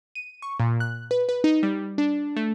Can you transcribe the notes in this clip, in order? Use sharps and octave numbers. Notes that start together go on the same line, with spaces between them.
D#7
C#6
A#2
F#6
B4
B4
D#4
G3
D4
A3